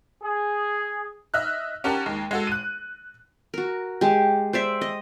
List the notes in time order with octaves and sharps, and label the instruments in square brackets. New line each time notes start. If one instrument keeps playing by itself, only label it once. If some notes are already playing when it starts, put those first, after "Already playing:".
[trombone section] G#4
[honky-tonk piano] D#5 E5 F6 F#6
C#4 G4 A#4 F#5 A5
D#2 G#3
G#3 F#4 A4
F#6 D#7
[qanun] F#4 A#4
G#3 G4
C5 D5 E5
D#5